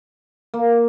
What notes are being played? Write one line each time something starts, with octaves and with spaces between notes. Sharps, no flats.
A#3